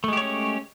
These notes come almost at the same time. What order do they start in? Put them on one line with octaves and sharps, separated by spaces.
A3 G#3 G4 C#5 C#4